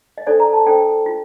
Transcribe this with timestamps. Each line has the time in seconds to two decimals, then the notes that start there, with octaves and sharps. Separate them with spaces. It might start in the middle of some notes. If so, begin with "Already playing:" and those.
0.18 D#5
0.27 D4 A4 C5 D5
0.40 A#5
0.53 A5
0.66 D4 A4 C5 G5
1.06 F4